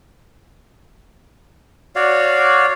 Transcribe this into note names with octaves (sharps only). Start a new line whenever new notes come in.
F#4 C#5 D5 F5